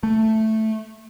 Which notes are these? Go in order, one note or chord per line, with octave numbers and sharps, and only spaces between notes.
A3